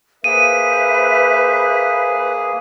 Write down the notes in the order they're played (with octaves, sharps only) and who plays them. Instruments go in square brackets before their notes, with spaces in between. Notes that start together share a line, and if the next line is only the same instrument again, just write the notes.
[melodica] A#3 G#4 [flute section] B4 C5 E5 [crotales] D#7